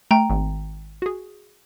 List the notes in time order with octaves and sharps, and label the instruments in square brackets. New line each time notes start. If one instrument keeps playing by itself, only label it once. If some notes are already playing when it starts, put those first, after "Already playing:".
[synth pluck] A3 [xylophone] G5 A#5
[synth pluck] G#1
F#4 G#4